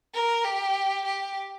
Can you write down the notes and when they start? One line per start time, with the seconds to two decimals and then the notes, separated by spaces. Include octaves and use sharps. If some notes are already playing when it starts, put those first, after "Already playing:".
0.14 A#4
0.44 G4
1.05 G4